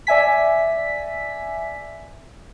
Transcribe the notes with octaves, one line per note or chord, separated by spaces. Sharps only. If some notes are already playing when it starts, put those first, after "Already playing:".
D5 E5 G#5 B6